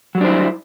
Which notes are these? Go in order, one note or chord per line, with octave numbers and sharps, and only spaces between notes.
F#3 G3 D4 E4 C5